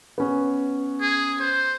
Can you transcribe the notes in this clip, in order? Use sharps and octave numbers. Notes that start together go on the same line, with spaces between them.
B3 C#4
G#4
C5